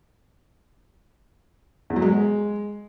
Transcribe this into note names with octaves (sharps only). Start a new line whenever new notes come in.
E2
F#3
G#3